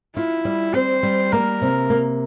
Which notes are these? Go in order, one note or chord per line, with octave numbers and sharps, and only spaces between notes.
E4 F4
G3
C4 C5
G3
A#3 A#4
C3
A#3